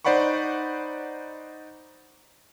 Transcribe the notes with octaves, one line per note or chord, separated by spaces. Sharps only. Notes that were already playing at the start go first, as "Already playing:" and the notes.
D#4 C5 D5 F#5 B5 C#6